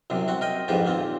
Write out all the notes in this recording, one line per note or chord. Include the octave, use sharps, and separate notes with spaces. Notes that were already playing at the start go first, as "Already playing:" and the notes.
C2 F#2 C3
C4 F#4
A#4 D#5 G5
F2 G#2 E3 F3 G4
D#2 A#2 A#3 C4